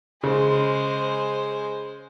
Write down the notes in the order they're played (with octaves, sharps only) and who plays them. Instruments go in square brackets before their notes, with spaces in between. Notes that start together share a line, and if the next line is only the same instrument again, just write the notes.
[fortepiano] C#3 [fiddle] G#3 C5